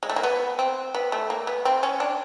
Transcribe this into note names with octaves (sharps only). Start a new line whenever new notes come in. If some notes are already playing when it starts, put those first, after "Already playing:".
G#3
A3
A#3
B3
C4
B3
A3
A#3
B3
C4
C#4
D4